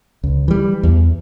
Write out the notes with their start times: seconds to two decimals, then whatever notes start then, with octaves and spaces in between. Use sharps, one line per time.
0.23 C#2
0.48 E3 G3
0.83 E2